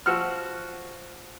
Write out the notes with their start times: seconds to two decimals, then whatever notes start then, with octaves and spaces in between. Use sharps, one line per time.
0.06 F3 F#4 F#5 E6 F6